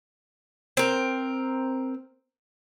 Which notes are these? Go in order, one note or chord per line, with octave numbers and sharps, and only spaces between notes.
C4 A#4